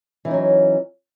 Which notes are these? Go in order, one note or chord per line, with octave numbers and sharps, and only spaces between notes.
E3 F#3 C#4 D#4